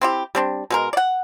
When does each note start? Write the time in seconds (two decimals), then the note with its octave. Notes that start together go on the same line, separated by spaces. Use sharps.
0.01 C4 E4 G4
0.35 G3 C4 D4
0.70 B2 G#3 A#4
0.93 D5 F#5